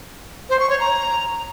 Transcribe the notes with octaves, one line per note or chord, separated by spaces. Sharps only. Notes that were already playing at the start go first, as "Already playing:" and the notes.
C5
C#6
C#5
A#5